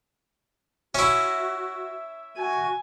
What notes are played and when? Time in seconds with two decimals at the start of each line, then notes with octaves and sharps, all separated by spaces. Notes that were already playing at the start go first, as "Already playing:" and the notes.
0.95 C#4 E4 F#4 E5
2.37 F#4 G#5